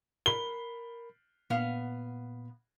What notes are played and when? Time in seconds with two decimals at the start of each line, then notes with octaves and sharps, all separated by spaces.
0.26 A#4 B5 G7
1.50 A#2 B3 F5